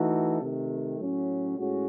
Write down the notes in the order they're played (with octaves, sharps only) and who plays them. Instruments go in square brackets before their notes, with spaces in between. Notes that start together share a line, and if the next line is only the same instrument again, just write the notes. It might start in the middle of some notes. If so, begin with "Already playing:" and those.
Already playing: [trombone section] E3 A3 D#4 F#4 A4
C3 D#3 A3
A2 F#3 C#4
A2 G#3 C#4 F#4